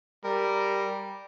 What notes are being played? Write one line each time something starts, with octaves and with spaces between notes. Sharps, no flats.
G3 A#4